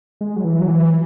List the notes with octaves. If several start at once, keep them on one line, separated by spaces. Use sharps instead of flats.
G#3
F#3
E3
F#3
E3